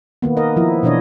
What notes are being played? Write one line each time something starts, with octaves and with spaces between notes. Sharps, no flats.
D#3 A#3 B3
A#4 D#5
F3 E4
B2 E3 D4 C#5 D#5